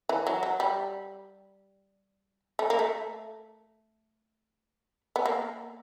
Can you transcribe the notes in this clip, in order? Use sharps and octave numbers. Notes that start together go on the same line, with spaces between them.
E3
F#3
F#3
G3
A3
A#3
A3
B3
A#3